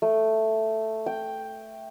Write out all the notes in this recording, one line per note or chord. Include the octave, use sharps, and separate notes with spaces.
A3
G5